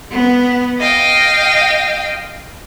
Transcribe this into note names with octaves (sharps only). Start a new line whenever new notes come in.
B3
D#5 F5 G5